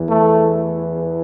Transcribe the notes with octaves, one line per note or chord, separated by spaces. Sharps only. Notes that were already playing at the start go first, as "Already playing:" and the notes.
Already playing: E2 E3
A3